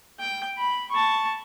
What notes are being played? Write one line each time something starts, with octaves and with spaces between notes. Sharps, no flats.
G5
B5
A5 C#6